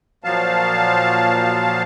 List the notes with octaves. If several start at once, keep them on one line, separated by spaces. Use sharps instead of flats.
A#2 F3 F#3 F5 A5